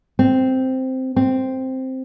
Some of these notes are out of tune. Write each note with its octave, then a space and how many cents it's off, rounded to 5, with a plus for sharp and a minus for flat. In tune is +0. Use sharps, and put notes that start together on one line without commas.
C4 -5
C4 +0